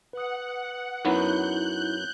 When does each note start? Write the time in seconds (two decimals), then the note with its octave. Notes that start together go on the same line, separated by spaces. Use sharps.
0.13 B4 F#5 D#6
1.05 F#2 F#3 B3 D#4 E4 F#6 G6